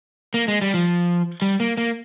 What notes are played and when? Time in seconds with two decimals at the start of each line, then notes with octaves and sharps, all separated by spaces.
0.34 A#3
0.48 G#3
0.61 G3
0.74 F3
1.42 G3
1.60 A#3
1.77 A#3